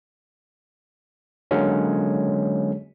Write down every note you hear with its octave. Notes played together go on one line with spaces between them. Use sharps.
D3 F#3 G#3 A#3 C#4